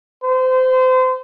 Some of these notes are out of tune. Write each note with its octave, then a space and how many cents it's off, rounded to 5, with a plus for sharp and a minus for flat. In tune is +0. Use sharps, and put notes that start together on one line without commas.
C5 -30